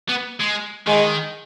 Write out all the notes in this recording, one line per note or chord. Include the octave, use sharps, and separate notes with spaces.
B3
G#3
D#3 G#3